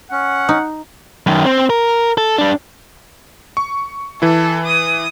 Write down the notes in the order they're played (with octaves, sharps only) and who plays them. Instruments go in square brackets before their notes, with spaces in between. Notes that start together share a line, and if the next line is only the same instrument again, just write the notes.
[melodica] C#4 [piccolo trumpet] F#5
[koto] D#4
[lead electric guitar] F#2 D#3
C4
A#4
A4
G3 D4
[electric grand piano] C#6
[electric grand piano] E3 E4 [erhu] A4
[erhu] D#6